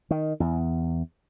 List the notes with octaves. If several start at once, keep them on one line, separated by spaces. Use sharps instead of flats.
D#3
E2